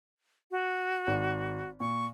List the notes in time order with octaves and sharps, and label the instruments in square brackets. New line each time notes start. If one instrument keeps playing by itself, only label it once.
[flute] F#4
[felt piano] G#1 D#3
[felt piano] A#2 [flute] C#6